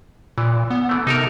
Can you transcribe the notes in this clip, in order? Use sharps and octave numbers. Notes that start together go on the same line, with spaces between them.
A#2 E3
B3
E3 A3
C3 D#4 A4 A#4